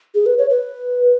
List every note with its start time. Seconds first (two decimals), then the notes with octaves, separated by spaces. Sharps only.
0.15 G#4
0.26 B4
0.38 C#5
0.50 B4